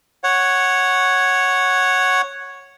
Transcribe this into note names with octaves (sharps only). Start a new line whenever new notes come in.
C#5 F#5